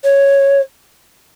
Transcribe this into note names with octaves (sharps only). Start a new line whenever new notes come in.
C#5